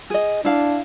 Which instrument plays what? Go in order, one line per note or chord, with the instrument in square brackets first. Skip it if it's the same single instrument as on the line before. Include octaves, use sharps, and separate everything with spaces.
[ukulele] G#4 D#5
[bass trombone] D4 [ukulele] E4 F5